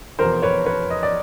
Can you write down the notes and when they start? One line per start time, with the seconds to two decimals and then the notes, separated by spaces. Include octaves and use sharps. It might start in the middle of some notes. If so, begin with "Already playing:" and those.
0.19 F1 E2 B2 A#4 C5
0.43 B4 C#5
0.66 B4 C#5
0.90 D#5
1.03 D5